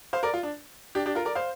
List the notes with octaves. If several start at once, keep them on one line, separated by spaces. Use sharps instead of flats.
C5 F5
A#4 D5
F4
D4
D4 G4
D4 G4
F4 A#4
A#4 D5
C5 F5